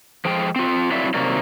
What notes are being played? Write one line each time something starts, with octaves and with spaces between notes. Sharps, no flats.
F3 G#3 G5
C4 F4
F#3 C4 E4 F4 D5 E5
C3 D#3 F#3 A#3 D5